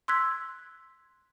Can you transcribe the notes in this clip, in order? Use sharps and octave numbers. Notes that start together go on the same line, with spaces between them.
C6 E6 F#6 G#6 B6